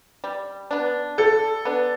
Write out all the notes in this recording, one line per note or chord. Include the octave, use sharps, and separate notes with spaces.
G3
B3 D4
G3 A4
B3 D4